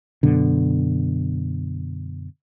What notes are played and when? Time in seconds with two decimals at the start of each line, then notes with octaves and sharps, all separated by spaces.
0.23 F#2 B2 D3